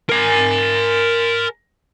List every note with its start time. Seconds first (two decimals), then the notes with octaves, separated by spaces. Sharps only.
0.09 A#4 G#5